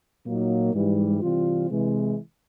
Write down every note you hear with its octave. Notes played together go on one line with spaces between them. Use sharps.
A#2 F#3 A#3 D#4
G#2 E3 G3
C3 E3 G3 C4 F4
C3 E3 G#3